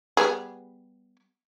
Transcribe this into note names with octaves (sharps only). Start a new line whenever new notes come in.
G3 B3 G#4